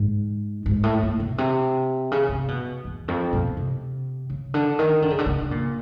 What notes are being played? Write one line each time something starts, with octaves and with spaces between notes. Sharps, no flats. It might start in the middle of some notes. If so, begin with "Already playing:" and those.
Already playing: G#2
G#2
A2
A#2
B2
C3
C#3
C3
B2
E2
F2
B2
C3
C#3
D3
D#3
D3
C#3
D3
C#3
A#2